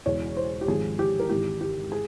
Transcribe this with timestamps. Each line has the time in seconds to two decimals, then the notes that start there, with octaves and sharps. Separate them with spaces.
0.06 E1 E2 E3 C#5
0.36 C5
0.61 G4
0.67 G#1 G#2 F3 G#4
0.99 G4
1.20 A#4
1.29 G#1 G#2 E3 G4
1.61 G4
1.92 G#4